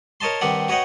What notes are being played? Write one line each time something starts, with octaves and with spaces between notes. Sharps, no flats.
A#4 C#5 D#5 A5 C6
G2 D#3 C4 G4 F#5
F#4 B4 C#5 D#5 F#5 G5